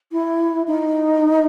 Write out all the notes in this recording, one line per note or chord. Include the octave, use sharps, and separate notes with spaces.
E4
D#4